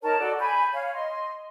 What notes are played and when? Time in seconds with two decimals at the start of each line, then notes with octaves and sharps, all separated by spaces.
0.02 D#4 A#4 C#5 A5
0.18 F#4 A4 D5
0.39 G#5 B5 G6
0.73 C#5 F5
0.93 D#5 C6